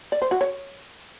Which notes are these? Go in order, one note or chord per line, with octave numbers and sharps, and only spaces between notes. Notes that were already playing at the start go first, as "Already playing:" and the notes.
D5
C5
F#4
C#5